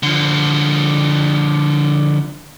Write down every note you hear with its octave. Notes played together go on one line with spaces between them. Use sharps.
D3 F3